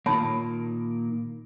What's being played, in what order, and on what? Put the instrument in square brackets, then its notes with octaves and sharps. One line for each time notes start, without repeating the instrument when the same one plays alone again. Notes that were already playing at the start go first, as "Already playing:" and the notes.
[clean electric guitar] A#2 D#3 A#3 [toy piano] C#5 A5 B5